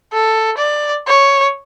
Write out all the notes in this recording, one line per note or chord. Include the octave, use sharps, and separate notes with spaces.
A4
D5
C#5